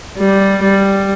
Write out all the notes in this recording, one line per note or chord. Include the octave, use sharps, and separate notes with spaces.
G3
G3